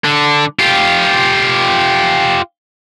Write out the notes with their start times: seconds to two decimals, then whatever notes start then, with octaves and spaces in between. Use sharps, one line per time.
0.05 D3
0.59 F4 G4